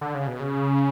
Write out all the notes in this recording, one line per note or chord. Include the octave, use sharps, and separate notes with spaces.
D3
C#3
B2
C#3